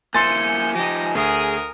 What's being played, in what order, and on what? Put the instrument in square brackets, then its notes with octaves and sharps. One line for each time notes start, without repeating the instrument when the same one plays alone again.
[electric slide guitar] A#3 E4 C5 [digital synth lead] G#5 [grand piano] C6 A6 [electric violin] G6 C#7
[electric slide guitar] F3 D#4 [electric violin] G4 A#6
[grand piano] D2 [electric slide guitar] G#4 [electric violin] A#4 D#6